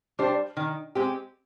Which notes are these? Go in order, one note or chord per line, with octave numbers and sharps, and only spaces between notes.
G3 D4 G4 C5
D#3
G#3 C4 G4